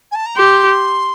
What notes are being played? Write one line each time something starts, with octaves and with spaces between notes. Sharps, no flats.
G#5
A5
A#5
G4 C6